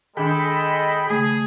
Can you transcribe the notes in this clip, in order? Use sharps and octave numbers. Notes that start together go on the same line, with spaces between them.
D#3 G#3 D4 G#4 A4 D#5 G5 B5
C#3 A3 G#4